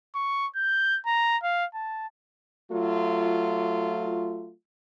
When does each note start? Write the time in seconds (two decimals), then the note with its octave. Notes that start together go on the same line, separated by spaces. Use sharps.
0.15 C#6
0.56 G6
1.06 A#5
1.43 F5
1.74 A5
2.71 F#3 A3 F4